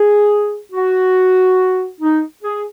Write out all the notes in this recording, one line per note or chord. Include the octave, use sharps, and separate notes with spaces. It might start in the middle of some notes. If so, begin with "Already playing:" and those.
Already playing: G#4
F#4
D#4
G#4